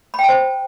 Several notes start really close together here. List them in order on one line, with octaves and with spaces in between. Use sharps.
B5 G5 A5 C5